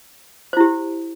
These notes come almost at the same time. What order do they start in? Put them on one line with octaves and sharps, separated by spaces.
C5 E4 G4